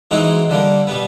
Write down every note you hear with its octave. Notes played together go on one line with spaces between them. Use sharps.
E3 G#3 C4 D#4 F#4
D3 G3 A#3
B2 G3 B3